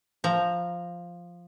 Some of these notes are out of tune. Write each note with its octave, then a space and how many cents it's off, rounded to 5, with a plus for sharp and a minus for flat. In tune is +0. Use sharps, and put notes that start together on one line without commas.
F3 +0 A#5 +0